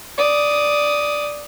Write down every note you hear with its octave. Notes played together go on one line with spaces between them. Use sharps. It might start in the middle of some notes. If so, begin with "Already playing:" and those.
D5 D#6